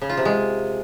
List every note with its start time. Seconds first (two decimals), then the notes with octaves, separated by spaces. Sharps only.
0.01 C#3
0.09 F4
0.17 C3
0.25 G#3